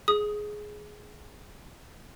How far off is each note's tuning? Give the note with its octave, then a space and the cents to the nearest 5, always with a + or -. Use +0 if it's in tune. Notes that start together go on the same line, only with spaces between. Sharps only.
G#4 +10 D#6 +0